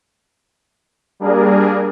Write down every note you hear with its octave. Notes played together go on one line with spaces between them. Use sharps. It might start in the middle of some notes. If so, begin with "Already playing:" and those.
G3 A#3 D4 G#4 A#4